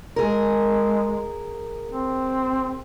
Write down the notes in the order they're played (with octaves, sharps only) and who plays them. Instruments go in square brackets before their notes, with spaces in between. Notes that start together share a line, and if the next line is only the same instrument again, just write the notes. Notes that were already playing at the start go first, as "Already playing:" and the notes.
[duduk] G#3 [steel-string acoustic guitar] G#4 A#4
[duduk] C4